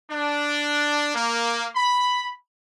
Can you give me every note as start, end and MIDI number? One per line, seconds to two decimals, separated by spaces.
0.11 1.15 62
1.15 1.67 58
1.76 2.32 83